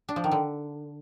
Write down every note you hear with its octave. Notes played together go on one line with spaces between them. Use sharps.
D4
F3
D#3
D3